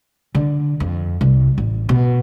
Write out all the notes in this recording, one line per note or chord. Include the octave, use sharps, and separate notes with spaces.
D3
F2
C2
A1
B2